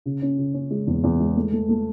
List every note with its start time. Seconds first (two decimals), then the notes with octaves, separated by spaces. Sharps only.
0.06 C#3
0.22 C#4
0.38 C#3
0.54 C#4
0.71 G#3
0.87 E2
1.03 E2
1.20 G#3
1.36 A3
1.52 A3
1.69 A3